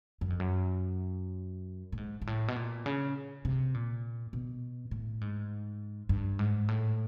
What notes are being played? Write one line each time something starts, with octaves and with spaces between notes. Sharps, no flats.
F#2
F2
F#2
A2
G#2
G#2
A2
B2
A#2
C#3
C3
A#2
B2
A2
G#2
G2
G#2
A2